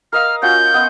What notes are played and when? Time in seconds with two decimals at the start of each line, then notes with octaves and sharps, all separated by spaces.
0.13 A#4 D#5 F5 F6
0.42 C#4 F4 F#4 G6
0.74 B3 D#5